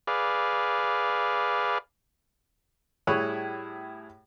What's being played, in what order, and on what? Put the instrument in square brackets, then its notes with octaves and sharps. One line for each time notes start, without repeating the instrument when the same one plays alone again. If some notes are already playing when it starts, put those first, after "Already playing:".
[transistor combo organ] G#4 B4 D5 F5
[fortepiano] A2 G3 E4 G#4 C#5 F#6